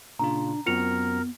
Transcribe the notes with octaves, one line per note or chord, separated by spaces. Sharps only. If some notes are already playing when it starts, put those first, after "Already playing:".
A#2 C#3 D4 F4 A#5
F#2 B3 C4 F4 F#4 A#4 C#7 F7